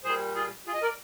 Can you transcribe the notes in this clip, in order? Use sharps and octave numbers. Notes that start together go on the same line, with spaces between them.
A#2 G3 G#4 C5
F4 G#4
F4 G#4
D#5
A#4 D5